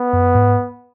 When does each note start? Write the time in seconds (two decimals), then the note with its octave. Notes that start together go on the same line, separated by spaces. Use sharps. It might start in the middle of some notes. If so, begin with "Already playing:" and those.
Already playing: B3
0.13 F#2
0.35 G#2